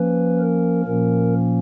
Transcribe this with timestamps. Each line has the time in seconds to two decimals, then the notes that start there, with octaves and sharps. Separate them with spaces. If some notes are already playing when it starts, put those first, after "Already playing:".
Already playing: F3 A#3 C#4 B4
0.40 A#4
0.85 A#2 F3 A#3 C#4 A#4